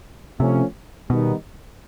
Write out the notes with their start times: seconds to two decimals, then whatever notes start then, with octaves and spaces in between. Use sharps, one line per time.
0.40 C3 F3 A3 C#4
1.10 B2 D#3 G3 B3 D#4